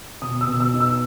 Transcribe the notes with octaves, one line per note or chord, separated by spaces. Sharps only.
B2 D#6
E6
B2
E6
D#4
E6